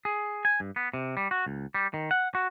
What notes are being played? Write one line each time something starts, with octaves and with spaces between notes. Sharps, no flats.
G#4
G#5
G2
B3
C3
G3
F#4
C#2
G3
D#3
F#5
F#4